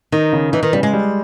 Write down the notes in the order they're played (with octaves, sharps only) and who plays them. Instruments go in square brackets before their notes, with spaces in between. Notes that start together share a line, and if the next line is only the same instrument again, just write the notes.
[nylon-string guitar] D#3 [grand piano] D#4
[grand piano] C#3
[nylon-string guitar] E3 [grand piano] D#4
[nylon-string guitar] D#3
[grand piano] C#3 [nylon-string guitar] G3
[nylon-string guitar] G#3
[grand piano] G3